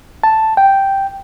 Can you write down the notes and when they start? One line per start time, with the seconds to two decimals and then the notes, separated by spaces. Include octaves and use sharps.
0.24 A5
0.57 G5